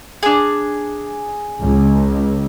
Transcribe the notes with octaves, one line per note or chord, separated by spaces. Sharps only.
D4 G#4
C#2